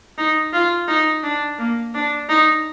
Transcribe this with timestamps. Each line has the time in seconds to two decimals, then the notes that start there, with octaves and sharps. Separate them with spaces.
0.18 D#4
0.53 F4
0.88 D#4
1.23 D4
1.59 A#3
1.94 D4
2.29 D#4